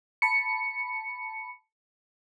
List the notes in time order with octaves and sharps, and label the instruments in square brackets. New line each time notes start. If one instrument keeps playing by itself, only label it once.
[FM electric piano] A5 B5 C#7